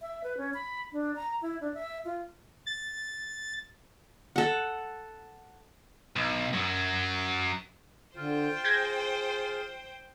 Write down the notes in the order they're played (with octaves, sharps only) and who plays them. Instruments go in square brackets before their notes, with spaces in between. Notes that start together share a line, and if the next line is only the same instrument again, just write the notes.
[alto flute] E5
B4
C#4
B5
D4
A#5
E4
D4
E5
F4
[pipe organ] A6
[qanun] A4 F#5
[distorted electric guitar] B1
F#2 F#3
[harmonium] D3 [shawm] F4 [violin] C5 G5
[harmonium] G#4 [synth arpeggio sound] G6 G#6 A#6